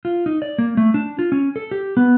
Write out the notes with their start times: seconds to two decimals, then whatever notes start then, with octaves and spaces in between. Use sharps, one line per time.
0.05 F4
0.26 D#4
0.42 D5
0.58 A#3
0.77 A3
0.94 D4
1.19 F4
1.32 C#4
1.56 A4
1.71 G4
1.97 B3